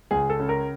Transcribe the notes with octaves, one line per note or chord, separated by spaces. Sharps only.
C#2 G#4
A4
C#3
A#4